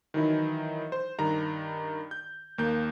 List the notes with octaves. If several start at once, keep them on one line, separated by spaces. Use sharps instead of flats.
D#3 E3 F#3 D#4 E4
C5
G2 D#3 A#5
G6
D#2 A#3 G6